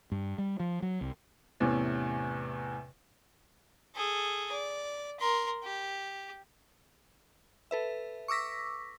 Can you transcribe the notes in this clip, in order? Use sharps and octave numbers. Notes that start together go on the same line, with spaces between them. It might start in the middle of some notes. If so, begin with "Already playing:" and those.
G2
G3
F3
F#3
C2
E2 A2 C3 C#4
G#4 A4
D5
A#4 C6
G4
A4 B4 E5
C#6 D6 E6 A#6 B6